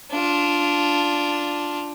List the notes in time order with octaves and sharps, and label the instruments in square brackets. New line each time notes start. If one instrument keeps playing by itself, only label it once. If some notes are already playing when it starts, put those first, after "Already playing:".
[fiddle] D4 F4